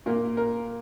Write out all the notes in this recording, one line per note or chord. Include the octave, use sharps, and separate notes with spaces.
A#2 A#3 A#4
A#4